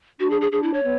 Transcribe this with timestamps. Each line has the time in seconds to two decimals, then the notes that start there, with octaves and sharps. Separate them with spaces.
0.20 D4 F#4
0.30 G#4
0.41 G#4
0.52 D4 G#4
0.63 E4
0.74 C#5
0.84 B3